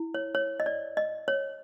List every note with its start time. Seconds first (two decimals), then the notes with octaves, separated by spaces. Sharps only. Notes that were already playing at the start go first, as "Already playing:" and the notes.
Already playing: E4
0.14 C#5
0.35 C#5
0.60 D#5
0.66 D5
0.97 D#5
1.28 C#5